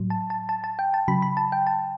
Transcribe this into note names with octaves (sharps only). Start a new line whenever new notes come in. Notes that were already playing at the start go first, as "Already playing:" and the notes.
Already playing: A2 F#3
A5
A5
A5
A5
G5
A5
C#3 F#3 B5
B5
A5
G5
A5